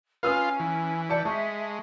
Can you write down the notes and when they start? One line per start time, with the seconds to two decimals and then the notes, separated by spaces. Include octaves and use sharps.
0.23 C#4 F4 B4 F5 D#6 F6
0.60 E3
1.09 D5 A5 G6 C#7
1.25 G#3 E5 A5 C#6